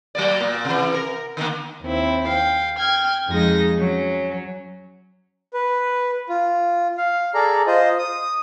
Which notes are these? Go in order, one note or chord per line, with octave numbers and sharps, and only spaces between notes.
F#3 A#3 D5
A#2 A#3
C3 E3
A#4
D3 D#3 A#3
D#2 C4 E4
F5 G5
G5 F6 G#6
F2 G#3 D#4 A#6
F#3 C#4
B4
F4
F5
G#4 A4 D5 A#5
F4 C5 D#5
D#6